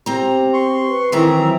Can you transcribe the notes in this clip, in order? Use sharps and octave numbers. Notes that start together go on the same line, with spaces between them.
C4 G4 A#5
C6 C#6
B4
D#3 E3 C4 E5 A#5
F#3